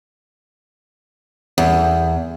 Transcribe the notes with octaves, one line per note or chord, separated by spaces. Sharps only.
E2